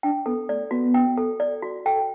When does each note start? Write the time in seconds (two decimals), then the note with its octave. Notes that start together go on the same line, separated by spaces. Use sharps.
0.03 D4 G5
0.26 B3 A4
0.49 A3 D5
0.71 B3 F#4
0.94 G5
1.18 A4
1.40 D5
1.62 F#4
1.85 A4 G5